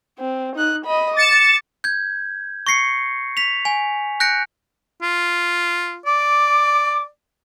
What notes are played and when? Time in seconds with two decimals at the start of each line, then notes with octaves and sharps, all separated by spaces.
0.18 C4
0.56 D#4 F#6
0.85 D#5 B5
1.16 D6 A6 C#7 E7
1.84 G6 G#6
2.67 C#6 A#6 C7 C#7
3.37 B6 F7
3.65 G#5
4.20 F#6 G6 A#6 C#7 D7
5.02 F4
6.06 D5 D6